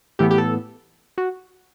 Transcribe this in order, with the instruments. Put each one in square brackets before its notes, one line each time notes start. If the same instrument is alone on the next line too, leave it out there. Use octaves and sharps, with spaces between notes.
[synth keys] A2 E3 B3 G4
G4
A4
F#4